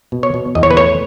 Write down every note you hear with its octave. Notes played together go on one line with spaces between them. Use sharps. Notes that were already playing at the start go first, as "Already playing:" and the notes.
B2
C#5
B2
E2 D#5
C#5
B4
A3 C#5